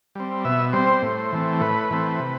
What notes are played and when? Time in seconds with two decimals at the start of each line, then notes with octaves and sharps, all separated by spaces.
0.15 G3 C4
0.45 B2 E5
0.73 G3 C4 C5
1.02 A2
1.32 E3 A3 C4
1.61 A2 B4
1.91 E3 A3 C4
2.19 C3